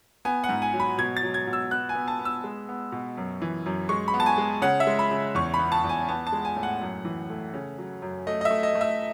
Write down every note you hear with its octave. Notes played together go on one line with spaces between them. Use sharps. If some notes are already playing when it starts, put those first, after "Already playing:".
B3 G#5
F#5
G#2
G#5
F#3
B5
B2 G#6
A6
F#3
G#6
B2
E6
B3 F#6
G#5
B3
A5
B3
E6
G#3
B3
B2
F#2
E3
F#2
G#3 C#6
B5
B3
A5
G#5
G#3
C#3 F#5
E5
G#3
B5
C#3
E2 C#6
B5
B3
A5
E2
G#5
B3 A5
A5
G#3
G#5
A2
F#5
F#2
E3
A3
C#3
F#3
F#2
A3 D#5
D#5
E5
A3
D#5
A3
E5